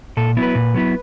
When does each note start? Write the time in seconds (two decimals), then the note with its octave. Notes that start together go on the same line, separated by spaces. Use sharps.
0.17 A#2 A4
0.37 F#3 B3 E4
0.43 B4
0.55 A#2
0.74 F#3 B3 E4